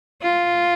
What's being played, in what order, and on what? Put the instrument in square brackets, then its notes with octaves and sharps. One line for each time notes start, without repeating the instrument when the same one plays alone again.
[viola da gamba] F4